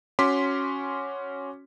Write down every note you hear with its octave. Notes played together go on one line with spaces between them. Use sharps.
C#4 F#4 C6 D6 B6